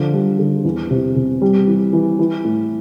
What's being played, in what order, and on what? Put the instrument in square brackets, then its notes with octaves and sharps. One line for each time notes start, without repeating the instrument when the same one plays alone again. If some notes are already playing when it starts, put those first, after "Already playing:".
Already playing: [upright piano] D3 F3
G3
D3
E2
C3
C3
G3
E3
E3
E3
A2